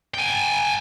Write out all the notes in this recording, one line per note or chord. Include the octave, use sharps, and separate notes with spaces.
G5 G#5